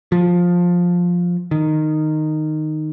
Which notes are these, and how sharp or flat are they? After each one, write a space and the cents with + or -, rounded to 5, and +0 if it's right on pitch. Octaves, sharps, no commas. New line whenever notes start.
F3 +10
D#3 -10